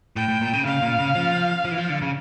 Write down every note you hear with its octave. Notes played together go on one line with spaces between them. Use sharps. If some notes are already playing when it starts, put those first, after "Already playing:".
A2 G5
A2
A#2
C#3
C#3 F5
A#2
C#3
F3
F3
E3
F3
D3
C#3